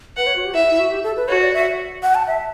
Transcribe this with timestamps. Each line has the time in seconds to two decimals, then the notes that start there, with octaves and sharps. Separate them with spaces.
0.17 B4 F#5
0.27 C#5
0.36 F#4
0.45 G4
0.54 E4 E5
0.71 E4
0.79 F#4
0.91 G4
1.03 A4
1.16 B4
1.28 F#4 C#5
1.41 D5
1.53 E5
2.03 F#5
2.15 A5
2.27 E5